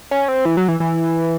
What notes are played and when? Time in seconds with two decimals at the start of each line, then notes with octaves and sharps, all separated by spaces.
0.11 C#4
0.28 C4
0.45 E3
0.57 F#3
0.68 E3
0.80 E3